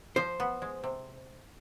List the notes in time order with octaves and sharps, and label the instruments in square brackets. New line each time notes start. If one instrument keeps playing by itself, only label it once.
[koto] F3 [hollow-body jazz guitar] C5
[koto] B3
G#3
C3